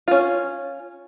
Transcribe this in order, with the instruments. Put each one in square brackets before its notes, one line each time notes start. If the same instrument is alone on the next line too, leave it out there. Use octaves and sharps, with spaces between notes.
[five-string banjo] C#4 F4